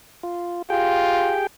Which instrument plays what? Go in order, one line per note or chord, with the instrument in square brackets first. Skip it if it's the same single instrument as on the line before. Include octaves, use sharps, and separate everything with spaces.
[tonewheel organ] F4
[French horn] F4 [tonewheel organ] G4 G#4 G5